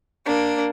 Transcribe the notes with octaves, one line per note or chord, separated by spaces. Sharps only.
A#3 D4